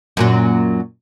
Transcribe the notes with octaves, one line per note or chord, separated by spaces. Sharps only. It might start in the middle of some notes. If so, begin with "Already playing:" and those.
F#2 A#2 F#3